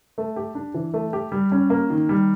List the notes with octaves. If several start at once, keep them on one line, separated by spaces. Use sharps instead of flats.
A3
G4
D4
E3
A3
G4
G3
C#4
A#3
D#3
G3